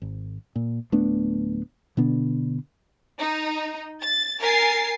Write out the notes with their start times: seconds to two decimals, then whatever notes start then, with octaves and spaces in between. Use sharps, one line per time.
0.02 G#1
0.56 A#2
0.92 D1 A3 B3 D4
1.97 B2 D3 B3 D4
3.20 D#4
4.01 A6
4.41 A#4 G#5 A6 C7